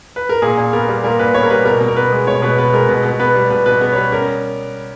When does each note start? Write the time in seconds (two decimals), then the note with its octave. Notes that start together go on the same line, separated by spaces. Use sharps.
0.16 B4
0.29 A#4
0.42 A#2 G#4
0.58 A#2
0.73 B3 A#4
0.88 G3
1.04 A#2 A#4
1.19 A#2 B4
1.34 B3 C#5
1.43 A#4
1.50 G3 B4
1.65 B2 A#4
1.81 B2
1.88 A#4
1.96 B3 B4
2.12 G#3
2.27 B2 C#5
2.42 B2 B4
2.57 B3 B4
2.73 G#3 A#4
2.88 B2 B4
3.05 B2
3.20 B3 B4
3.35 G3
3.50 B2 B4
3.66 B2 B4
3.81 B3
3.92 C#5
3.96 G3 B4
4.12 C#4 A#4